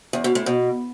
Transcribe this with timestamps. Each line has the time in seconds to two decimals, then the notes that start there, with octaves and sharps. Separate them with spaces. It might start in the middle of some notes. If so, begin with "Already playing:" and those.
0.13 E2
0.24 B2
0.35 A2
0.46 B2